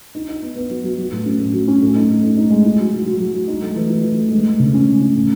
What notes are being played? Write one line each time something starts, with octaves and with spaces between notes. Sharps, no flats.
D#4
D#4
B3
B3
F#3
F#3
F#3
A2
C#4
A2
F#3
C#4
A2
D#4
A2
D#4
D#4
G#3
E4
F#3
F#3
F#3
F#3
F#3
D#4
A3
E3
E3
E3
A3
G#3
G#3
C#3
C#4
G#3
C#4
A2